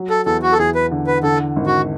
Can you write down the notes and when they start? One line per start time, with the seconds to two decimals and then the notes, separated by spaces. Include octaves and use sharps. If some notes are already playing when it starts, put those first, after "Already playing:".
Already playing: F#3
0.10 A4
0.26 E2 A4
0.43 F#4
0.53 A4
0.59 E2 G#4
0.75 B4
0.91 D3
1.07 B4
1.23 D3 A4
1.56 G#1
1.67 F#4